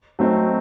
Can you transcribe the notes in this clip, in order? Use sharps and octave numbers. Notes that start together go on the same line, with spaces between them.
F#3 A3 C4 D#4